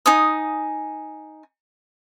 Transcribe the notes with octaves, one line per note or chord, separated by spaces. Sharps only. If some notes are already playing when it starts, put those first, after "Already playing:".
D#4 G#5 D#6